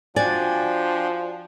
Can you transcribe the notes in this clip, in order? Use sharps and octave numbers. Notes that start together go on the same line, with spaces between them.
F3 D4 F#4 D5 G5 G#5